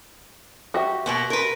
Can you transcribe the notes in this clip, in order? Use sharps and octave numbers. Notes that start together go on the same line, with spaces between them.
F#4 G4 E5
B2 A#3 B3
A#4 B4